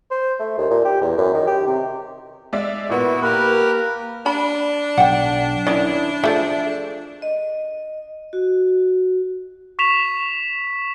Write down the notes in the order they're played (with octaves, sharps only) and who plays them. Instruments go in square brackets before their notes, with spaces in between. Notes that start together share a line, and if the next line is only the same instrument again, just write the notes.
[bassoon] C5
A3
D#2
A#2
G4
E2
F#2
D#3
G4
C3
[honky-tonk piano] G#3 D5 E5
[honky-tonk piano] A#2 B3 [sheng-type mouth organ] E4 F#4
[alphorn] A#3 [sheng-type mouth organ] G4 A#4 B4 [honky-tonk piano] B5
[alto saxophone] D4 [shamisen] B5
[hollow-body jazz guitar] B1 [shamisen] F#5 G5
[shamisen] D#3 C#4 [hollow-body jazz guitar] E4 D5
[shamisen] F3 A3 [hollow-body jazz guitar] G#4 A4 E5
[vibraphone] D#5
F#4
[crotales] C#6 B6 E7 F7